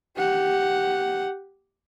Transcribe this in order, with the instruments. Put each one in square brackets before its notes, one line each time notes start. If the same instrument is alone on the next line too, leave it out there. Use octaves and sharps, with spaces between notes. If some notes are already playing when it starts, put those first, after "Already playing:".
[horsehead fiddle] G4 F#5